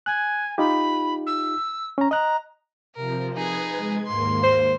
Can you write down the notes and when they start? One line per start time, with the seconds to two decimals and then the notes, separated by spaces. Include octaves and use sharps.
0.06 G#5 F#6
0.58 D#4 F4 G4 B5
1.26 E6
1.98 C#4 A#5
2.11 D#5 A#5 F#6
2.96 C3 F3 A#4
3.33 D#4 G#4 B4 G#6
3.75 G#3
4.06 D#2 G#2 A#3 C6
4.44 C5